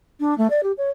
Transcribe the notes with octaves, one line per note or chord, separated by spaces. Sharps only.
D4
A3
D5
G4
C#5